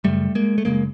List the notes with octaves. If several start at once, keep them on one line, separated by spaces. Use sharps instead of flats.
F#1 F#2 C#3 G3 A3
G#3 A#3
A3
F#1 F#2 C#3 G#3 A#3